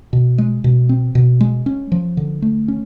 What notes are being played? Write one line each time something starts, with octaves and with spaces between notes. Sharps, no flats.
B2
G#3
B2
C4
B2
G#3
C#4
F3
D3
A3
C#4